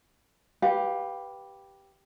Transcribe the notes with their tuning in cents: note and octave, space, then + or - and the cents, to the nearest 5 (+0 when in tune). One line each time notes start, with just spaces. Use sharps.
G4 +0 B4 -5 F5 +25